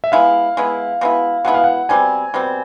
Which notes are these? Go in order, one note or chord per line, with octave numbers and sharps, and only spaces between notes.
E5
G#3 B3 E4 F5
G#3 B3 E4
B2 G#3 B3 E4
B2 G#3 B3 E4 F#5
F5
F#5
B2 G3 C4 G#5
B2 G3 C4